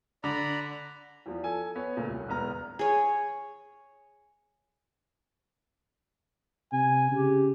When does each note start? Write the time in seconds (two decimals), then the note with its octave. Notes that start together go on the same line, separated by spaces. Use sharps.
0.24 D3 D5 A#5 B5
1.26 E2 F3
1.44 A4 G#5
1.75 B3 C#5
1.97 A#2 C#3 A3
2.08 C2
2.28 E1 B3 A#5 F6
2.79 G#4 C#5
6.73 C3 G#5
7.11 C#3 G4